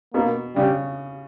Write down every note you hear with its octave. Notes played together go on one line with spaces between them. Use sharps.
B2 A#3
C#3 G3